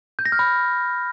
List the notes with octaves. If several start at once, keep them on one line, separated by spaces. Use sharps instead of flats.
G6
A#6
F6
B5